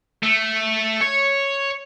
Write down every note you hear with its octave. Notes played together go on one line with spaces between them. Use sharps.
A3
C#5